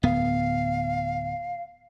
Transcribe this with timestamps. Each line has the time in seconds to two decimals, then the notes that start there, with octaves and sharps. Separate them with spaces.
0.03 D1 B3 F5